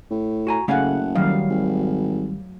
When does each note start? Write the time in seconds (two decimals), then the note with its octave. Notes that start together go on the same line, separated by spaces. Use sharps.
0.10 A2
0.47 F#4 G#5 A#5
0.68 F#1 C#3 A3 F5 F#5 G#5
1.15 D#3 F#3 G3 F5
1.49 G#1